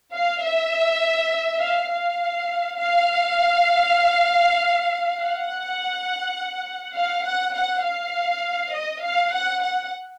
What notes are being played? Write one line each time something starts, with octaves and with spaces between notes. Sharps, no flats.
F5
E5
F5
F5
F5
F#5
F5
F#5
F#5
F5
D#5
F5
F#5
F#5